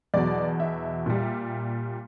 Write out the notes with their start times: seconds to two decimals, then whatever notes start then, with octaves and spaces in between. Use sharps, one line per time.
0.14 E2 B2 F#3 D5
0.60 E5
1.06 A#2 G3